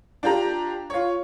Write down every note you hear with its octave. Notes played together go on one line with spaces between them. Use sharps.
D4 F4 G4 A#5
F4 C#5